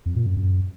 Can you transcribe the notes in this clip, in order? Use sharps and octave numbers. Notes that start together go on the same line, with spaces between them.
F2
A#2
F#2
F#2